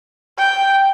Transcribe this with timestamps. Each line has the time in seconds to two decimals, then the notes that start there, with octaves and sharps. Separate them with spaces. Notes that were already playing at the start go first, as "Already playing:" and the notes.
0.38 G5